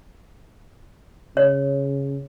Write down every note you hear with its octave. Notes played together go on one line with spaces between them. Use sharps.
C#3 C#5